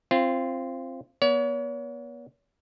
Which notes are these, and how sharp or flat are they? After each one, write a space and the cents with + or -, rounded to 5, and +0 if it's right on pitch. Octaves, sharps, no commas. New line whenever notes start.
C4 +10 F4 -20
B3 -35 C#5 +40